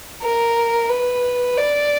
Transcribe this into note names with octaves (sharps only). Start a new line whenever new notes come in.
A#4
B4
D5